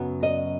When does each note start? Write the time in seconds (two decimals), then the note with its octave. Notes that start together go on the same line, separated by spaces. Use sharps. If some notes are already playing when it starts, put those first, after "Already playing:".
Already playing: F#2 C#3 F#3 B3
0.23 D#5